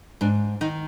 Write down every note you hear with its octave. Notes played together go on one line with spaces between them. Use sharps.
G#2 D4
D#3 D#4